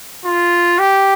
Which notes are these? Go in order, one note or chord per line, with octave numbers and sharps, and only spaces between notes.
F4
G4